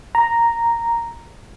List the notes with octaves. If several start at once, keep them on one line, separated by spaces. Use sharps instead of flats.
A#5